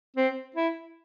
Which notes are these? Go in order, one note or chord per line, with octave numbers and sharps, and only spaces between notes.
C4
E4